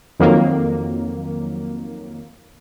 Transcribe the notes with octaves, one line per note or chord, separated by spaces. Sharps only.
F2 D#3 F#3 A#3